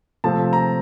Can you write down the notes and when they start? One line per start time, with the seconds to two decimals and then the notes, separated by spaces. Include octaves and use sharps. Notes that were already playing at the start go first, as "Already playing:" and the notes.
0.24 C3 F3 A3 C4 A5
0.53 A#5